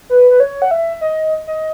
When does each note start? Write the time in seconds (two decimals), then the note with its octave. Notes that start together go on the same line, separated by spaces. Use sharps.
0.10 B4
0.31 B4
0.40 C#5
0.62 F#5
0.71 E5
1.01 D#5
1.47 D#5